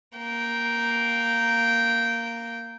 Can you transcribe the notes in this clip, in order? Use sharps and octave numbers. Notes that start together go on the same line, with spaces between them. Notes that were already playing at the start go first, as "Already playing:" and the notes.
A#3 G5